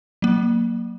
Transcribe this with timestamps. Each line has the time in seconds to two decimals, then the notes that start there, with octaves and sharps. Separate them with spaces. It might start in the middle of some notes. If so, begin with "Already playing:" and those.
0.22 F#3 A#3